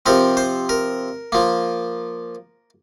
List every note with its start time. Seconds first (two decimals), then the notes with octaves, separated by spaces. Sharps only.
0.06 C3 F3 C4 A#4
0.37 C5
0.69 A#4
1.32 F3 A#3